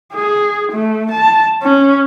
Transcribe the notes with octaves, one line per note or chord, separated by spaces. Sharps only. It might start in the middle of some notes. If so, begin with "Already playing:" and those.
G#4
A3
A5
C#4